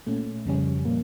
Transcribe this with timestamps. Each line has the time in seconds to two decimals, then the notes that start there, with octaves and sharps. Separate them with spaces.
0.07 A#2 A3 C#4
0.46 F2 C#3 G3 C#4
0.85 A#2 F3 A#3